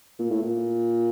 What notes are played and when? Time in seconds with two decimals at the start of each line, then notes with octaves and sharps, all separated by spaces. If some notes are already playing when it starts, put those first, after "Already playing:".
0.19 A#2
0.30 A2
0.42 A#2